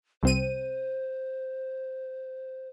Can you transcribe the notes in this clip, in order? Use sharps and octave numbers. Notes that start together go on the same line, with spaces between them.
C2 C4 C5 D#7